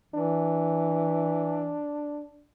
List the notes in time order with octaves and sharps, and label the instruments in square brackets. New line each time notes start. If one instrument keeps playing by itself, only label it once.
[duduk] E3 [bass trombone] D4